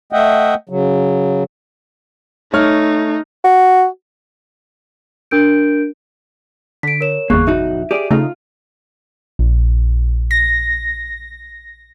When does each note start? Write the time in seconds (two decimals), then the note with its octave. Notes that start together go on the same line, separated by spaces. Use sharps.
0.13 A3 D#5 E5 F#5 G5
0.69 C#3 F#3
2.53 A3 D#4 C#5 F6
3.44 F#4
5.31 D4 A#4 G6 D7
6.83 D3 B6 D7
7.01 A#4 C#5 E7
7.30 G1 E2 A#3 G#4 C#6 F#6
7.47 B1 D#4 F#4 E5
7.91 G4 G#4 D5
8.11 C#3 A3 D#4 F4
9.39 A#1
10.31 A#6